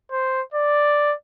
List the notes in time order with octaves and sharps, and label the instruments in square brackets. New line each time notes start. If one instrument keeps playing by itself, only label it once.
[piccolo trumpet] C5
D5